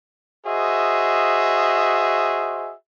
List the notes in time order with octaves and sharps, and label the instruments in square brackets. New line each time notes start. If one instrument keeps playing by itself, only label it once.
[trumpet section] F#4 G#4 C5 D#5 E5